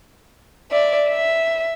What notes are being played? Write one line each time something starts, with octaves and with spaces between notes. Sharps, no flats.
D5 E5
E5